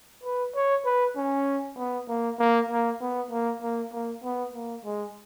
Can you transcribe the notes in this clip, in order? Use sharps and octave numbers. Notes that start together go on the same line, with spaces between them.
B4
C#5
B4
C#4
B3
A#3
A#3
A#3
B3
A#3
A#3
A#3
B3
A#3
G#3